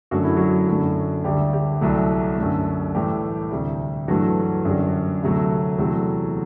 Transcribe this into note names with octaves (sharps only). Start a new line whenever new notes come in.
F#2 D3 A3 F#4
E4
F#3 F#4
F#2 D3 A3
D2 D3 G3 G4
G3 G4
C2 C3 F#3 A3
F#2 D3 A3
A2 E3 G3 A3 G4
D2 C3 G3
G2 E3 F#3 A3 F#4
F#2 D3 G3
D2 C3 F#3 A3
E2 C3 F#3 A3